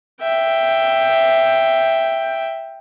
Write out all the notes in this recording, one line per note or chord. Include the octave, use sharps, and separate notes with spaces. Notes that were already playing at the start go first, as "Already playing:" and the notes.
E5 G5